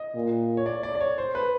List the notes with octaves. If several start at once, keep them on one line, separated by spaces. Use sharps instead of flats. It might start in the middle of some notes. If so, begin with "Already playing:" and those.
Already playing: D#5
A#2
C#5
D5
D5
D5
C#5
C5
B4